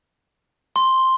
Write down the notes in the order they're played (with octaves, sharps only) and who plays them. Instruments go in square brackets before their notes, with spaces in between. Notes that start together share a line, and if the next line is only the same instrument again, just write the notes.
[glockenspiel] C6